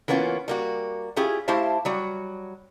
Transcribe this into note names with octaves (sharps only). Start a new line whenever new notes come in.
E3 A#3 B3 C#4 F4 F#4
G3 A#3 F#4
C#4 E4 F4 G4 G#4
A3 E4 G4 C5 F5 A5
F#3 G3 F#4